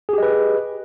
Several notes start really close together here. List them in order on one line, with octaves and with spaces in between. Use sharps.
G#4 G4 D#5 B4